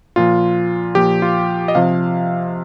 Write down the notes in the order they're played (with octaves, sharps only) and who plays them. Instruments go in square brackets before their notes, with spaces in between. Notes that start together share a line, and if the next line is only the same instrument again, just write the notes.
[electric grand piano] A#2 F3 F4
A#2 F3 G4
F4
D#5
C3 F3 F5